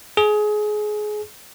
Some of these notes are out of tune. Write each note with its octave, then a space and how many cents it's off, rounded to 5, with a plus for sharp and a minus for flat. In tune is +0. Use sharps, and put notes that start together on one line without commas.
G#4 +25